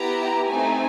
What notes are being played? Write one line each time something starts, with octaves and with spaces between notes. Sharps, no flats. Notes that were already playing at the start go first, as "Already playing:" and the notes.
Already playing: B3 E4 G4 A#5
A3 C4 D#4 G#5